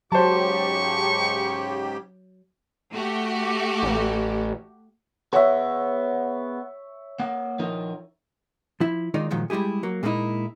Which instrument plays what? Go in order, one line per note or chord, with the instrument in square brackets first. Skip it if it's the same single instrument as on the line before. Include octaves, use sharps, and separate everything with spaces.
[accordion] G#2 C#3 G4 [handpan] F#3 [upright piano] C5 A5 [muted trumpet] C#6
[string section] A3 F#4 G4
[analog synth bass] A1
[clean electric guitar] B3 G#4 F#5 [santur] C#5 E5
[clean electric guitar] A#3 F#5
F3 D#4 A#4
[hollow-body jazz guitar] F3 E4
D#3 G#3 D#4 F4 D5
A#2 D#3 F3 F#3 G#3
G3 G#3 E4 G4 G#4
F#3 A#3
A#2 G#3 A#3 C#4 D#4 E4